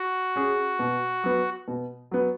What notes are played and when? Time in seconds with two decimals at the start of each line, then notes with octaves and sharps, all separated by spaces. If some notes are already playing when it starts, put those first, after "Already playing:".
Already playing: F#4
0.36 C#4 G#4
0.79 B2
1.24 F#3 B3
1.68 B2
2.11 F#3 B3